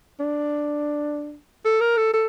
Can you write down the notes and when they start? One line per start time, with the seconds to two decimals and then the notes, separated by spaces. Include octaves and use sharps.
0.20 D4
1.65 A4
1.81 A#4
1.97 A4
2.14 A4